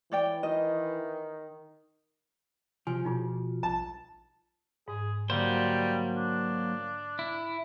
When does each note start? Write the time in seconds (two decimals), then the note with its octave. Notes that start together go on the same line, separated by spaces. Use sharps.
0.12 E3 C#5 D5 G5
0.43 D#3 D#5
2.87 C3 F3 G#5
3.05 B2 D#4 F4 G#4
3.63 A#1 A5
4.88 G#2 G#4
5.30 D3 F#3 G3 A#3 C5
6.16 D4
7.19 E4